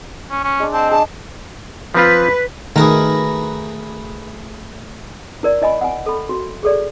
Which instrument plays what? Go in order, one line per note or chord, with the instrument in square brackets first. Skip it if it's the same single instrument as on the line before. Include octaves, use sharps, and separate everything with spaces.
[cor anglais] C#4
C#4
[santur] G#3 D4
[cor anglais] C4 [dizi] A5
[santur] D4 G#4 [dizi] A5
[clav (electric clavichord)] F3 C4 F4 [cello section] B4
[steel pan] D#3 [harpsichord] A3 F#4 G#4 [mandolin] A#4 B4
[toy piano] E4 A#4 D5
E4 D#5 G#5 B5
F#5 G#5
A4 B5
F#4
G#4 A4 D5